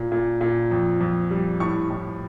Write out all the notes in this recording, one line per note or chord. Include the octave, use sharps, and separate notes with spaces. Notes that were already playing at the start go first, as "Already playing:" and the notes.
Already playing: A#2
A#2
A#2
F2
F2
G3
A2 C#6
A2